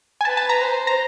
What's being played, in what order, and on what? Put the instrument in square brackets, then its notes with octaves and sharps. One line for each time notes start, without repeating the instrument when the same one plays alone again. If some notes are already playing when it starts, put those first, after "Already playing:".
[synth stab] G#5
[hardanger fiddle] B4 [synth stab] A5
[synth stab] A5
A#5
[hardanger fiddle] C5
[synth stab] A#5